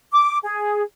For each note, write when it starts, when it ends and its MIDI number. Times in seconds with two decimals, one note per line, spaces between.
0.12 0.38 86
0.43 0.82 68